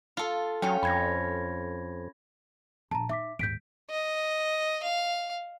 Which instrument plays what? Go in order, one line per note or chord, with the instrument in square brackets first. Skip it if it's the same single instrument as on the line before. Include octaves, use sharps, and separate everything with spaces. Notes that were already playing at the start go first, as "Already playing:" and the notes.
[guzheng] F4 A4
[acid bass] F#3 [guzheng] C#4 F4 [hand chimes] G5
[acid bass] F2 [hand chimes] B5 G#6 A#6
[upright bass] A#1 [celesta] A5 A#5
[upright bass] D#4 [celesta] E5 D6 B6
[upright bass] D#2 G#2 [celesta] G6 B6 D7
[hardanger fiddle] D#5
F5